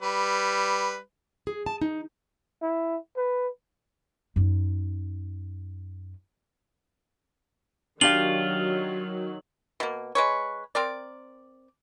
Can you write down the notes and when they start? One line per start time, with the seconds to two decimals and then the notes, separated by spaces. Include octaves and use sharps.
0.02 G3 B4
1.47 G#4
1.66 A5
1.82 D#4
2.62 E4
3.17 B4
4.36 F#2 D#4
8.01 D#3 F#3 D4 F4 G4 F5 F#7
9.80 B2 A#3
10.15 G#3 B4 C#5
10.75 C4 A#4 D5